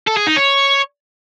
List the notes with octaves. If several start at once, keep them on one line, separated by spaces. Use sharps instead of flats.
A4
G#4
D#4
C#5